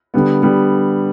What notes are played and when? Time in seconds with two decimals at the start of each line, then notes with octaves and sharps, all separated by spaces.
0.14 D3 G3 B3
0.42 D3 G3 B3